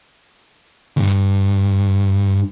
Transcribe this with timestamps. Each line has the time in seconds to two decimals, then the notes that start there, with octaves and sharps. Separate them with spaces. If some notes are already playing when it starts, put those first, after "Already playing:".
0.97 D2 G2